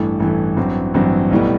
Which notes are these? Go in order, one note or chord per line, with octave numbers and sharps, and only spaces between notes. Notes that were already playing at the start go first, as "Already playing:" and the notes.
Already playing: A1 G2 E3 A3
A1 G2 E3 A3
A1 G2 F#3 C4
A1 G2 F#3 C4
B1 A2 G3 B3